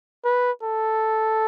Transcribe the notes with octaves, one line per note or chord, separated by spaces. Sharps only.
B4
A4